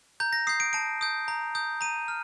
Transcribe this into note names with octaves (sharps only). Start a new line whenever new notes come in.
A#5 G6
A#6
D#6 G6 C7
D7
A5 D7
D#6 G6
A#5
D#6 G6
A#5 D#7
F6